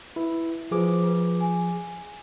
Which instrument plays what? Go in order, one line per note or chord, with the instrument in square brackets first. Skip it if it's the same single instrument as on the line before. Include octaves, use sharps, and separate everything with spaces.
[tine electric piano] E4 [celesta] B4
[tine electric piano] F3 G#4 D6 [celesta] F4 B4 C5
[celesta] F4 B4
G#5